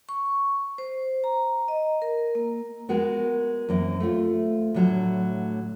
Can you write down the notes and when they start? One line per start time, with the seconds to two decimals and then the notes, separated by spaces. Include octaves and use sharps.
0.09 C#6
0.78 C5
1.24 A#5
1.68 D#5
2.02 A#4
2.35 A#3
2.89 G#3 B3 F#4 A#4
3.69 F#2 E3 A#3 C4 C5
4.00 A3 C4 F4
4.74 A2 D3 F#3 G3 A3